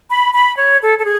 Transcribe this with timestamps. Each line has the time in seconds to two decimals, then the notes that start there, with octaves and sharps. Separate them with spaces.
0.09 B5
0.33 B5
0.56 C#5
0.81 A4
0.98 A4
1.04 G#4